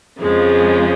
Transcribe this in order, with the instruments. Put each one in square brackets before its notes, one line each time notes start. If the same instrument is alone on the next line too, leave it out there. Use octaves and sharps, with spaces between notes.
[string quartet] F2 C#3 F3 [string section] G#3